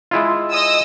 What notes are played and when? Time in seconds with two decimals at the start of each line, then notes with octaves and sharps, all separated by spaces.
0.11 G#3 E4 F4
0.50 D#5 D#6 E6